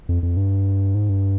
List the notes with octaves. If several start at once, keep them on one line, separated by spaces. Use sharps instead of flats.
F2
F2
G2
G#2
G2